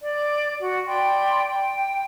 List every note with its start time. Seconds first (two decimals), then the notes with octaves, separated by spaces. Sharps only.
0.01 D5
0.61 F#4
0.86 D5 G5 B5 C6
1.43 G5